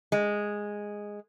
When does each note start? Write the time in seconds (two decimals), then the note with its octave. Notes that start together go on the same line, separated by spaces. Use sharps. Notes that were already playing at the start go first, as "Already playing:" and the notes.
0.12 G#3